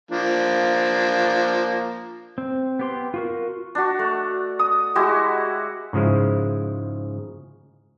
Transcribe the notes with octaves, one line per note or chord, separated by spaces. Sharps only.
F3 A#3 D4
C4
B3 G4 C6
F4 F#4 A#4
D4 F#4
A3
D#6
G#3 E4 F#4 G4
G#2 C#3 F3 G#3 E4